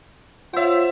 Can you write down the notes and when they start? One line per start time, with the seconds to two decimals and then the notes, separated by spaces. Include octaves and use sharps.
0.53 F4 C5 C#5 E5 F#5